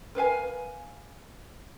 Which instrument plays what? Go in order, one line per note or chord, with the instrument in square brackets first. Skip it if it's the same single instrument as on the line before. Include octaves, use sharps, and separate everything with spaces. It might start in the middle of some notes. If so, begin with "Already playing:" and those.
[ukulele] A#4 B4 F5 G#5